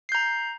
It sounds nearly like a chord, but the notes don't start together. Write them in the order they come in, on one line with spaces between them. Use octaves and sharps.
C7 G6 A#5